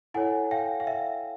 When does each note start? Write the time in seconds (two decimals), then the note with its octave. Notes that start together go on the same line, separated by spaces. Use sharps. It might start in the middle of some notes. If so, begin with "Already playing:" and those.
0.14 E4 A4 C#5 F#5 G#5
0.51 F5 G5
0.80 F5
0.87 E5